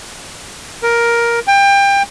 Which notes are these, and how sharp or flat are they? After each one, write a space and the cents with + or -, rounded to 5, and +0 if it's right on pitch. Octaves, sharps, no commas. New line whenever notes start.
A#4 +10
G5 +25